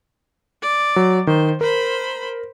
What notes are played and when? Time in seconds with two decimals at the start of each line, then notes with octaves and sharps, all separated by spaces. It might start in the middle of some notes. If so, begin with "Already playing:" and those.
0.62 D5
0.96 F#3
1.27 D#3 C5
1.61 A#4 C5 B5